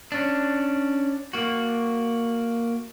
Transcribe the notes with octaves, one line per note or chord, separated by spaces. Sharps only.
C#4 D4
A#3 F#4